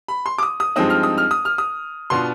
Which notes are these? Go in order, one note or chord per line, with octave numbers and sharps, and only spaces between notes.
B5
C6
D6
D#6
D#6
G2 F3 G#3 C4 D#4 D#6
F6
D#6
F6
D#6
F6
D#6
B2 B3 D4 F4 C6